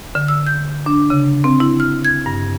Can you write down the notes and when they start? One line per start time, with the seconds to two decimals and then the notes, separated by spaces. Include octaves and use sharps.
0.15 D3
0.28 E6
0.47 G6
0.86 D4
1.10 C#3
1.44 C4
1.60 E4
1.80 F6
2.05 G#6
2.26 G2